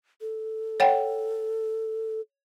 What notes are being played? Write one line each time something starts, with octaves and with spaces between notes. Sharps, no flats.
A4
C#5 F#5 G5